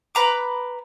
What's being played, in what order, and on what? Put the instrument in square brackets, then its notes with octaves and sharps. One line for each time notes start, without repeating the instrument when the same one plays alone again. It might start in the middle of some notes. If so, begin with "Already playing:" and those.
[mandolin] B4 A#5 D6